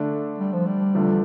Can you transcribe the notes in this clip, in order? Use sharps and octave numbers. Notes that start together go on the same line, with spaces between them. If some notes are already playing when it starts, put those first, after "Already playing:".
Already playing: D3 A3 D4 A4
G3
F3
G3
E2 D3 F3 A3